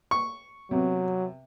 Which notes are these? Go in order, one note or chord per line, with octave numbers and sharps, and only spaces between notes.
C#6
C3 F#3 B3